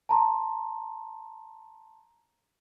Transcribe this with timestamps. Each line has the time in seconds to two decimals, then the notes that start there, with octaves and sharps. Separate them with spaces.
0.09 A5 A#5 C6